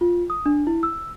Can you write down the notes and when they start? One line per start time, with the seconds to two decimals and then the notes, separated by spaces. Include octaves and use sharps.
0.01 F4
0.30 D#6
0.46 D4
0.67 E4
0.83 E6